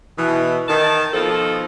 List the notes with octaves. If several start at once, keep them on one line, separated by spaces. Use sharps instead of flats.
B2 E3
D#3 A5
B2 F3 C4 D#4 F4 A4